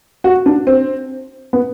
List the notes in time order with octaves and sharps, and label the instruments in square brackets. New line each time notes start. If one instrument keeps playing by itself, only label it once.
[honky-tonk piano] F#4
D4
C4
B3